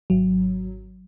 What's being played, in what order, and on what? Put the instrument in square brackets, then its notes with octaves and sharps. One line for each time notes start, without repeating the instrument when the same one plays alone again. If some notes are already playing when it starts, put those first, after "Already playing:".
[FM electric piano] G#1 F#3